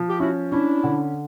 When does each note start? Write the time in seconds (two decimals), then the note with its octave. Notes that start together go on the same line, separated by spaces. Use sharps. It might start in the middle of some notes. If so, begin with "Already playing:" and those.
Already playing: F3
0.09 G4
0.20 C#4 E4 F#4
0.52 C#4 D4 E4
0.84 D3